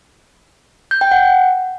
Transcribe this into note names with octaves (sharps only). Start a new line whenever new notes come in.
G6
G5
F#5